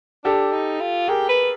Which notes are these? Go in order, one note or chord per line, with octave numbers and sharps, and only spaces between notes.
D4 G4 A4
D#4
F4
G4 G#4 A#4
B4